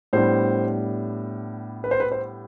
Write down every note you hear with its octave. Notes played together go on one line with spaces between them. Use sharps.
A2 G3 B3 D4 C5
B4
C5
B4
C5